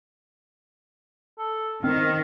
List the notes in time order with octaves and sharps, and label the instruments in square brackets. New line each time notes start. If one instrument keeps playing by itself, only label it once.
[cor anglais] A4
[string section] D#3 [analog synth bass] C4 [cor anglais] F5